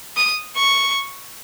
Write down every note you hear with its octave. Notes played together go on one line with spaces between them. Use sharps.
D#6
C#6